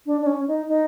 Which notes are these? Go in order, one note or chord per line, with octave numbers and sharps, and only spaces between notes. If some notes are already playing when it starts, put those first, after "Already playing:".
D4
D4
C#4
D#4
D#4